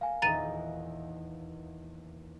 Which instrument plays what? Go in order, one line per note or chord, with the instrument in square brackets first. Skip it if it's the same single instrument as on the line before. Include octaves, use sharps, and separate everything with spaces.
[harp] A#3 [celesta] F5 G#5
[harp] D#1 E2 D#4 [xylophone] A#5 A6 D#7